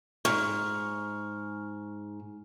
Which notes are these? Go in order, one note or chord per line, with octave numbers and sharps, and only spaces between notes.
G#2 C#6 F6